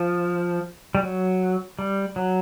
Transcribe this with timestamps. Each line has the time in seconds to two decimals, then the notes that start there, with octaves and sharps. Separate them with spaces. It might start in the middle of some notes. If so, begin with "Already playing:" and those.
Already playing: F3
0.95 G3
1.03 F#3
1.79 G3
2.16 F#3